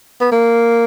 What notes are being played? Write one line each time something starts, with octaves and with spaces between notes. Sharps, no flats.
B3
A#3